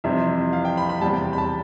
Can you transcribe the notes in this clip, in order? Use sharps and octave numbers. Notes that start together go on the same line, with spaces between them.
F2 C3 E3 G3 E5
F5
G5
B5
B5
E2 C3 G3 A5
G5
B5
A5